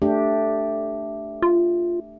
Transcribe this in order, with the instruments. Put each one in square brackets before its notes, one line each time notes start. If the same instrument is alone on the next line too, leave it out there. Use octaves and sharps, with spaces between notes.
[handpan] A3 D4 G4
[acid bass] F4